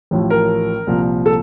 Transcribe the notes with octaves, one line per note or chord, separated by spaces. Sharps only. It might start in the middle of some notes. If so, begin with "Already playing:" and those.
A1 A2 F3
A#4
C2 A#2 F3
A4